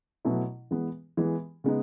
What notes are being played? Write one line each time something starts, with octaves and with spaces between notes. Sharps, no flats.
B2 F#3 A3 E4
E3 G#3 B3
E3 G#3 B3
C#3 G#3 B3 D#4